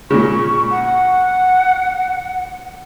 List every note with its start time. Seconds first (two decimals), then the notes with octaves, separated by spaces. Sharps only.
0.10 A#2 C#3 C#6
0.70 F#5